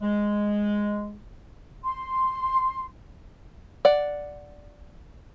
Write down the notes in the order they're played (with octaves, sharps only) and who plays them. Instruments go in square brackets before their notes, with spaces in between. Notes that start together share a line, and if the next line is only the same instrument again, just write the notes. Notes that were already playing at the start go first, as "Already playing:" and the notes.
[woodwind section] G#3
[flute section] C6
[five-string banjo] D5 F#5